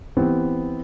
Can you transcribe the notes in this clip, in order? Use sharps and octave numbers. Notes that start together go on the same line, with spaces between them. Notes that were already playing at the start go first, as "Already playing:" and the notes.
E3 B3 C4 G4